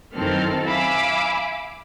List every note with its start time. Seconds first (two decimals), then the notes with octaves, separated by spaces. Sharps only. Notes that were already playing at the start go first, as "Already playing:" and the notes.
0.15 F#2 D#3 E3 C4 A4 F6
0.66 E5 F5 G#5 B5 D6 E6